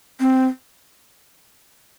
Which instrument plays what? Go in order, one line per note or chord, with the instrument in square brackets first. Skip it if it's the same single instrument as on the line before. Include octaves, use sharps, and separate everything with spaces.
[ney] C4